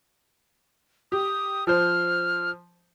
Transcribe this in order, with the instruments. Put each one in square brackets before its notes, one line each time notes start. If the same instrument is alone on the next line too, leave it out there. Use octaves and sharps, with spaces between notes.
[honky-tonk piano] G4 [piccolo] D#6
[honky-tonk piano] F3 C5 [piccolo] F6